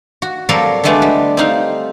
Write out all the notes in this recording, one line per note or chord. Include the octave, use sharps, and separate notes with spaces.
F#4
F#3 G3 C4 A4 A#4 F5
D3 F#3 G#3 A3 B3 D4
G3
C4 D#4 F5